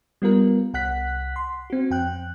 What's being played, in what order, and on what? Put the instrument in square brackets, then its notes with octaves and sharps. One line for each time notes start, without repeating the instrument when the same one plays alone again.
[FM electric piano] G3 B3 F4 A#4
C2 F#5 F#6 B6
C6
C4 F#4
F2 G5 F#6